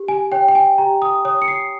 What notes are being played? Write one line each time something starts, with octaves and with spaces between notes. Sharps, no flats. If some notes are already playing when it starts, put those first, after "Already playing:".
Already playing: G4
G#5
C#5 G5
G5
G#5
G4 A#5
D#6
C#5 D#6
C#7
C7